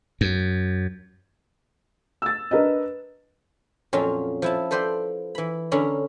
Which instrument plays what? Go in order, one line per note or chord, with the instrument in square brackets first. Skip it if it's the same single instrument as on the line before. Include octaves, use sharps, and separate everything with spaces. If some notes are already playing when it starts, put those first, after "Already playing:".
[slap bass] F#2
[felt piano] E6 A6
D4 A#4 B4 D#5
[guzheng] F2 A#2 F#3 C#4 F4
F3 E4 A5
A4 B4 C5 D5 G5
E3 B5
D3 C#4 A#4 B5